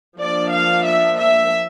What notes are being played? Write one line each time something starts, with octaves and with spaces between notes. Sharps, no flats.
F3 A#3 D4 D5
F5
E5
E5